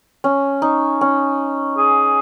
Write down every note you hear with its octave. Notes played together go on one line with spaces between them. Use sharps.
C#4
D#4
C#4
G#4